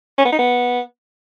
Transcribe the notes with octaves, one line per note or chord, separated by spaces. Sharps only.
C#4
B3
D#4
B3